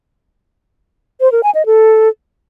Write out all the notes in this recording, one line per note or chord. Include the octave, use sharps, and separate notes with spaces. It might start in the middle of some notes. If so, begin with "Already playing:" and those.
C5
A#4
G#5
D#5
A4